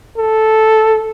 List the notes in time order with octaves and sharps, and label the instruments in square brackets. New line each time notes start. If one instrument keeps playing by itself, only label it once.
[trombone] A4